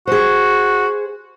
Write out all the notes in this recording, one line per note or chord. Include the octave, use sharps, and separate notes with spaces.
F#4 G#4 C5